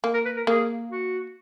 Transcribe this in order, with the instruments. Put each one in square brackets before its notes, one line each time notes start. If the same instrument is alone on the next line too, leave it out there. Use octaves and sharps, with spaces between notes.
[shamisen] A#3
[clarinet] A#4
B4
A#4
[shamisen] A#3 [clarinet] G#4
[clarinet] F#4